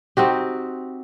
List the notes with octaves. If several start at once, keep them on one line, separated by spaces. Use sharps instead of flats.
C4 D#4 F#4 G4